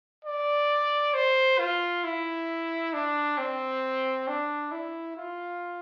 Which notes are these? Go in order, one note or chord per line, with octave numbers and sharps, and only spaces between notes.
D5
C5
F4
E4
D4
C4
D4
E4
F4